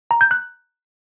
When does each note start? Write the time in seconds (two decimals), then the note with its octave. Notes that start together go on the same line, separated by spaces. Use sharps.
0.11 A#5
0.21 G6
0.31 F#6